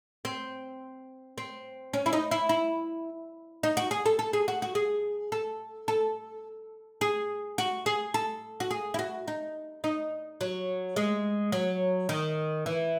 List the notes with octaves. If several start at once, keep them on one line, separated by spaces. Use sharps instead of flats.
C4
C4
C#4
E4
D#4
E4
E4
D#4
F#4
G#4
A4
A4
G#4
F#4
F#4
G#4
A4
A4
G#4
F#4
G#4
A4
F#4
G#4
E4
F#4
D#4
D#4
F#3
G#3
F#3
D#3
E3